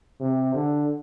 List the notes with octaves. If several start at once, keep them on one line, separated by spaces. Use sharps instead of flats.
C3
D3